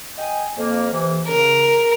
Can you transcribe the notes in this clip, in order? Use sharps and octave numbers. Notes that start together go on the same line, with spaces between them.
D#5 G5 G#5
F2 A#3
C3 E3
C#3 A#4